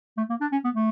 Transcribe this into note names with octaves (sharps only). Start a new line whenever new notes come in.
A3
A#3
D4
C#4
B3
A3